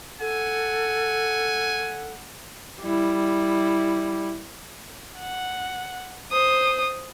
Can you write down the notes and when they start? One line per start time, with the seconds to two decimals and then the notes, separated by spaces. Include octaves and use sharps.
0.21 A4 F#5 G#5
2.82 G3 E4
5.19 F#5
6.31 C5 D#6